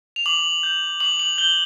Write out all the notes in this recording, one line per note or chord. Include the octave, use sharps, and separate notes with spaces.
F7
D6 F#7
G6
D6 F#7
F#7
G6 G7